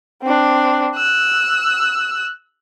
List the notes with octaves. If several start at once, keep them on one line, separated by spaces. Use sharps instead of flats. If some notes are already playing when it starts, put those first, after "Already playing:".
C4 D4
E6 F#6